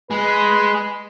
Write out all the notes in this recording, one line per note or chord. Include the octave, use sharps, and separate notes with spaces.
G#3 B4